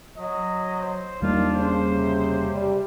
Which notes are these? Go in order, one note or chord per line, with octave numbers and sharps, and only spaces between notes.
F#3 D#5
C5
E2 D#3 G3 A#3 D4 F4
C#3 C5
C3
G3